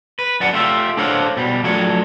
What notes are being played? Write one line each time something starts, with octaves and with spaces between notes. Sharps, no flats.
B4
F#2 D5 F#5 A5
A3 F4 G4 E5
D4 A4 C5 C#5 F5 F#5
B2 G3
F3 F#3 A3 D4 C#5